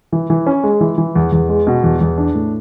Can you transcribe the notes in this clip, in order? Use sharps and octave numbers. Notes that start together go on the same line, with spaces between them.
E3
E3
C#4
G#3
E3
E3
E2
E2
G#3
B2
E2
E2
D4
A2